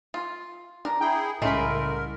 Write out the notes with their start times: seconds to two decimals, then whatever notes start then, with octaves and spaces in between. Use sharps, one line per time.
0.14 F4
0.85 D4 A#4
1.01 E4 G#4 G5
1.42 C2 A2 C#3 G#3 A3 A#4 B5